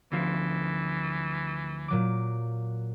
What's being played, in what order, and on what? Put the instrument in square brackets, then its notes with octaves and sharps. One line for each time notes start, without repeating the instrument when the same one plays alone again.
[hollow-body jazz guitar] D2 F3 [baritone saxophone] E3
[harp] A#2 F#3 D6